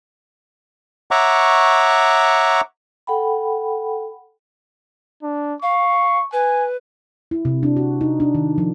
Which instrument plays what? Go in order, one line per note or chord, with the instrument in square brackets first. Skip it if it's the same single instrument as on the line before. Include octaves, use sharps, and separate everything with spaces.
[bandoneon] C#5 E5 F#5 A#5 C#6 D6
[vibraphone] A4 F#5 G5 B5
[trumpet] D4
[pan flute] F5 [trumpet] C#6
[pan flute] B4 [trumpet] G#5
[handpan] E4
C3
D4
F#4
D#4
D4
D#3
F3